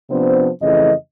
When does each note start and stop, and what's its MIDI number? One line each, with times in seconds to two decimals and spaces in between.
0.10 0.49 48
0.10 0.49 53
0.10 0.49 59
0.10 0.49 62
0.10 0.49 72
0.61 0.92 41
0.61 0.92 49
0.61 0.92 52
0.61 0.92 57
0.61 0.92 75